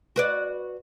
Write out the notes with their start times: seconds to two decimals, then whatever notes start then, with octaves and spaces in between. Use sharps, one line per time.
0.16 F#4 B4 D5